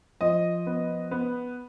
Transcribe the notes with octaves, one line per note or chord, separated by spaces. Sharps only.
F3 D#5
B3
B3